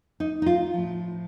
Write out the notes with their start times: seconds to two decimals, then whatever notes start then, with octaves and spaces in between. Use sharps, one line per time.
0.20 D#4
0.42 D#4
0.46 F4
0.74 A2 F3